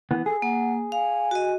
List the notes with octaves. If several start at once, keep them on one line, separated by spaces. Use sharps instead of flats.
E3 B3
G#4 A4
A#3 F#5
F5 G#5
F#4 D#5